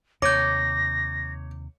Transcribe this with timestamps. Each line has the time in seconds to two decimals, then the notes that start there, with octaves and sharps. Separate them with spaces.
0.22 D#2 C3 C#5 D6 G6 A#6